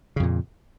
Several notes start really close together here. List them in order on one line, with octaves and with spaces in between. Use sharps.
C#3 F2 A#2